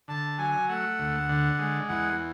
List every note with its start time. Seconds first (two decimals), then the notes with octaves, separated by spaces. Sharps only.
0.08 D3 A5
0.38 F#3 G#5
0.68 A3 F#5
0.99 D2
1.29 D3
1.59 G#3
1.89 E2 F#5